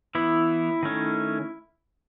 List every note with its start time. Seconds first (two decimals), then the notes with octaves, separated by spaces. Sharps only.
0.15 E3 B3 E4
0.83 D#3 A3 C#4